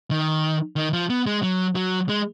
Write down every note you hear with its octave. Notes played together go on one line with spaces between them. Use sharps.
D#3
D#3
F3
B3
G#3
F#3
F#3
G#3